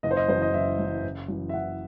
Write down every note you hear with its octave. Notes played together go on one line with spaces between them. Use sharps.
F#1 D#5
C5
D#5
F#2 E3 C5
D#5
F#1 E5
F#2 E3
F#1
F#2 E3
E5
F#1 F#5